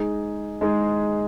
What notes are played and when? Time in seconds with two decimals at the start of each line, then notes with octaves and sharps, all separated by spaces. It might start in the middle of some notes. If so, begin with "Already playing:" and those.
Already playing: G#3 D#4 G#4
0.61 G#3 D#4 G#4